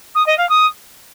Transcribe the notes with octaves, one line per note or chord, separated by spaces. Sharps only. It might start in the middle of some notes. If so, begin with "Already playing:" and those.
D#6
D#5
F5
D#6